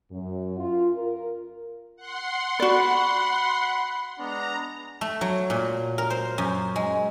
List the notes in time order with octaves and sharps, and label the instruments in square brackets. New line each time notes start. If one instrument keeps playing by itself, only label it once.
[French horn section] F#2
F4
A#4
[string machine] F#5 C6
[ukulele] F#4 D5 [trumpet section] B5
[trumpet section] G#3 B3 D4 [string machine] A#5
[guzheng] A3
F#3
A#2
A#4
C5
F#2
G#3